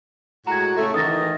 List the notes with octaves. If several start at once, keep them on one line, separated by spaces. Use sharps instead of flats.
A2 G#3 F#4 A#5 G#6
A2 C#3 A3
D#3 E3 D#6 A6 A#6